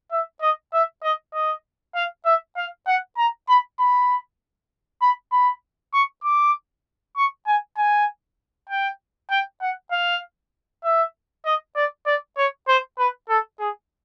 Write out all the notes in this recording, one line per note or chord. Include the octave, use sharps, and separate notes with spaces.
E5
D#5
E5
D#5
D#5
F5
E5
F5
F#5
A#5
B5
B5
B5
B5
C#6
D6
C#6
G#5
G#5
G5
G5
F#5
F5
E5
D#5
D5
D5
C#5
C5
B4
A4
G#4